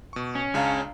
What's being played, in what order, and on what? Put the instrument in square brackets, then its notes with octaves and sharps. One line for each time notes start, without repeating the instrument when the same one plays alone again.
[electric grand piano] B2 C#6
[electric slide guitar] C#4
[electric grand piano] C#2 C#3 A5 [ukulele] D4 F5 A#5